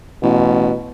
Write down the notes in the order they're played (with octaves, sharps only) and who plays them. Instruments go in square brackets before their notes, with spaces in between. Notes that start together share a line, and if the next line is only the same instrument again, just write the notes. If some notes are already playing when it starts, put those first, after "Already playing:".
[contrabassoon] A1 [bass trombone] B2